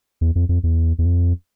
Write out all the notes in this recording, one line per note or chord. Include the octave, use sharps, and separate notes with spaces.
E2
F2
F2
E2
E2
F2